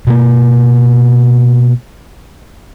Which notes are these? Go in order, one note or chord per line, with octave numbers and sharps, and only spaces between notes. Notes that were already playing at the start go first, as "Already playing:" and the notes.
B2 A#3